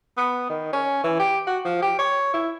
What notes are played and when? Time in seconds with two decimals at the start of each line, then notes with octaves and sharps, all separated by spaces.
0.17 B3
0.50 D#3
0.73 C#4
1.04 E3
1.20 G4
1.47 F#4
1.65 F3
1.82 G4
1.99 C#5
2.34 E4